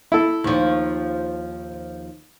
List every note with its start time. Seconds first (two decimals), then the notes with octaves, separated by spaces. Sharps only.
0.12 E4 A4
0.44 D#2 F3